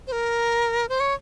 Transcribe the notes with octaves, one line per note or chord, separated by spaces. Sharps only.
C5
A#4
C5
C#5